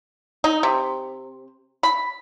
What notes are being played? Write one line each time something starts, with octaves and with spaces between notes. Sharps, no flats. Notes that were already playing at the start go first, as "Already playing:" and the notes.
D#4
C3
B5